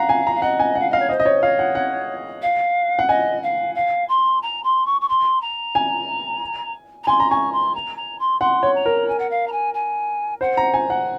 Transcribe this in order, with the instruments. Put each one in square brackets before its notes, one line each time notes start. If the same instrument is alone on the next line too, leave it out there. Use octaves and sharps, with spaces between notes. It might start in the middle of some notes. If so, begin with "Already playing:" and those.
Already playing: [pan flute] F5 [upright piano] F#5 A#5
[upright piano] G#5
A#5
[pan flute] F5
[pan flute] D#5 [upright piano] F#5
[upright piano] G#5
[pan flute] F5 [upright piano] F#5
[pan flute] D#5 [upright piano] F5
[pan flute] C#5
[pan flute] C5 [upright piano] D#5
[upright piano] D#5
C#5
[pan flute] C#5 [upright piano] F5
[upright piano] F#5
F#5
[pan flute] F5
[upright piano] F#5
[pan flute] D#5 [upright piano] G#5
[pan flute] F5
F5
C6
A#5
C6
C#6
C#6
C6
A#5
[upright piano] G#5
[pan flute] A#5
[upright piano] G#5 [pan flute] C6
[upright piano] A#5
[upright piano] G#5 [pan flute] C#6
[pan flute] C6
A#5
A#5
C6
[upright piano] F#5 [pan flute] C6
[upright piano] C#5
[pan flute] A#5
[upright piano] A#4
[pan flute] G#5
F#5
F5
A#5
G#5
G#5
[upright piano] C5 [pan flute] F#5
[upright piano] A#5
G#5
F#5